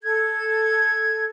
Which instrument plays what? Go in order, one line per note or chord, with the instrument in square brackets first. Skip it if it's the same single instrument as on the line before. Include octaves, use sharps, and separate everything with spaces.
[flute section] A4 G#6